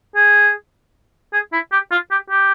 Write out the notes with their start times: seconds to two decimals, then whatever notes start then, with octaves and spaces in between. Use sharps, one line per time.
0.16 G#4
1.33 G#4
1.53 E4
1.72 G4
1.91 F4
2.11 G4
2.31 G4